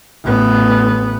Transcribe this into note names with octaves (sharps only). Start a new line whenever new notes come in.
A1 B3